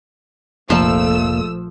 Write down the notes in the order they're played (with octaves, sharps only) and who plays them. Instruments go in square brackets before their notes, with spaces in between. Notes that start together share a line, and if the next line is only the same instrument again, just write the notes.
[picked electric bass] F1 A#3 [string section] A#1 A3 E6 [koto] F3